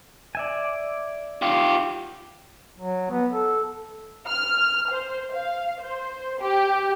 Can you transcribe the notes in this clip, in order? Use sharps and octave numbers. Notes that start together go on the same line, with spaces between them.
D5 E5 G#5
F4 G4
F#3
B3
A4
F6
C5
F5
C5
G4